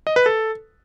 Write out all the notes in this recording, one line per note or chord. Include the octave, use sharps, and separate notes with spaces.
D#5
B4
A4